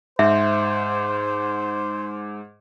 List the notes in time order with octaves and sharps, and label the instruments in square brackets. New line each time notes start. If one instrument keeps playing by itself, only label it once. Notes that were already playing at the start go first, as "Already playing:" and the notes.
[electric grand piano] G#2 [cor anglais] C5 [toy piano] E5